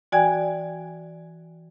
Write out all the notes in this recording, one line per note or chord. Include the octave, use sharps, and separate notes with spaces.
E3 F#4 D5 G5 G#5 G#6